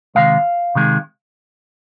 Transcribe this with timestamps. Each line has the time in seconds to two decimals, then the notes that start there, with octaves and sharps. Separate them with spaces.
0.15 C3 D#3 G#3 F5
0.75 C3 D#3 G#3